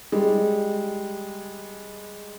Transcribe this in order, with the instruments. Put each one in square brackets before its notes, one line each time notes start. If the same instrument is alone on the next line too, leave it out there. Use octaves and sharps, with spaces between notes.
[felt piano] G3 G#3